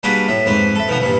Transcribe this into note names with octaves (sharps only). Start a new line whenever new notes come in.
G3 A#3 D4 F#4 G#4 B4
A2 E5
F2 G#2 C4 B4
A4 E5
B2 D#3 F3 B3
G2 A#2 E3